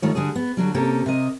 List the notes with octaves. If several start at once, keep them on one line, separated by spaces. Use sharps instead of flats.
D#3 G3 A3 F4 C#5
D3 G3 F#4 G#4
B3
D3 F#3 G3
C3 A#3 C#4 G4 A4
C3 A#4 D#5